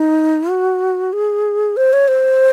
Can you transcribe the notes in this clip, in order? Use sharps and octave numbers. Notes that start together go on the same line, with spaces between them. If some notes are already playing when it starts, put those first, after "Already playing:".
Already playing: D#4
F#4
G#4
C5
C#5
C5